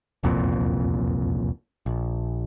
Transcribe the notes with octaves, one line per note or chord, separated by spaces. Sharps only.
E1 C2 F2 A#2
A#1